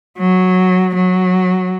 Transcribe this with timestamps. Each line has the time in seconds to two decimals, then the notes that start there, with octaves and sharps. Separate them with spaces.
0.18 F#3
0.95 F#3